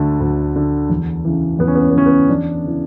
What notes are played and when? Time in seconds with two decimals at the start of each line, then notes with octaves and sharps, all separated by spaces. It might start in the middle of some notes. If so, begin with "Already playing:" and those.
Already playing: D2 D3 A3
0.20 D2
0.56 D3
0.90 E2
1.25 C#3 E3
1.59 E2 B3
1.67 C#4
1.75 B3
1.83 C#4
1.91 B3
1.94 C#3 E3 C#4
2.06 B3
2.29 E2 D4
2.63 C#3 E3